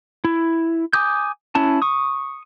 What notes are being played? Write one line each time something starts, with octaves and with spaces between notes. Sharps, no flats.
E4
G#5 D6 D#6 G6
C#4 E4 A5
C#6 D#6